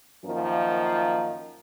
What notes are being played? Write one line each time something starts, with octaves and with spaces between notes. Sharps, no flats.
F#2 D#3 F3 A#3